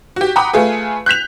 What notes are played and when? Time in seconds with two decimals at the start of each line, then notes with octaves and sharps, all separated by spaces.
0.16 F#4 G4
0.36 F#5 G5 A#5 B5 D6 D#6
0.53 A3 F4 G#4 B4
1.06 F#6 G6 B6 F7